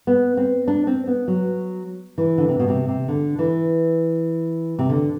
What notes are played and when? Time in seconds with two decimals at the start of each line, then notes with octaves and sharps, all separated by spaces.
0.07 B3
0.37 C4
0.68 D4
0.87 C4
1.07 B3
1.28 F#3
2.18 E3
2.38 D3
2.49 C3
2.59 B2
2.68 C3
2.88 C3
3.08 D3
3.39 E3
4.79 C3
4.89 D3